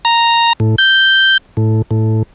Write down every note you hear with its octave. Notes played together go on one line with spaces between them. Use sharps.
A#5
A2
G6
A2
A2